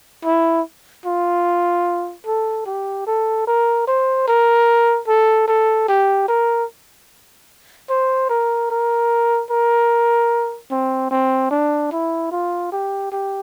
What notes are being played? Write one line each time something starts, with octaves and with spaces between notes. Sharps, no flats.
E4
F4
A4
G4
A4
A#4
C5
A#4
A4
A4
G4
A#4
C5
A#4
A#4
A#4
C4
C4
D4
E4
F4
G4
G4